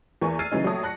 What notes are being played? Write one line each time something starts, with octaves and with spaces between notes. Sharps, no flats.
E2 E3 A#3 G#5 C#6
E6 F6 G#6 A6 C7 D#7
C#3 E3 F#3 B3 C#4 D#4
A#1 F#3 A3 C#5 A5 D#6
A5 F#6 A#6 C#7